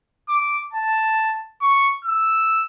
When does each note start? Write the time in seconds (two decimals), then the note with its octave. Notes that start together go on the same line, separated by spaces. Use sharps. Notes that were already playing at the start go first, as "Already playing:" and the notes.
0.29 D6
0.73 A5
1.61 C#6
2.04 E6